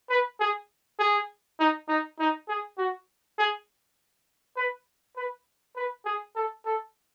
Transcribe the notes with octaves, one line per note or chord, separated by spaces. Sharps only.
B4
G#4
G#4
D#4
D#4
D#4
G#4
F#4
G#4
B4
B4
B4
G#4
A4
A4